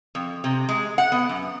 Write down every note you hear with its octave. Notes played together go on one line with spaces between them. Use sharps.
F2
C3
G#3
F#5
B3
F#2